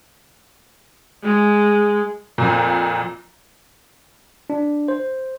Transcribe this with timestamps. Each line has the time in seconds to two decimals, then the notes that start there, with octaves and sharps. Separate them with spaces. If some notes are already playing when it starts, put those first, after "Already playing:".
1.25 G#3
2.38 F2 A#2
4.50 D4
4.88 C5